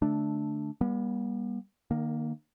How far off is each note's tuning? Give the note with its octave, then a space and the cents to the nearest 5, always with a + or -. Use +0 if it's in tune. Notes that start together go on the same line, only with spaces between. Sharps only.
D3 +0 A3 -10 D4 +0
G3 +15 B3 -45
D#3 -30 A#3 +5